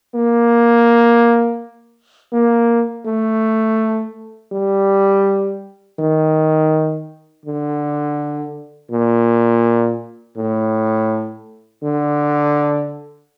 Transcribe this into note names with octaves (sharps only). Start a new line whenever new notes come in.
A#3
A#3
A3
G3
D#3
D3
A#2
A2
D3